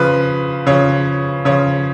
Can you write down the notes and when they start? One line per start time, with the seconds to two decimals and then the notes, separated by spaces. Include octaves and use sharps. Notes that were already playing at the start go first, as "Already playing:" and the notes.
Already playing: C#3 F3 B4
0.67 C#3 F3 C#5
1.45 C#3 F3 C#5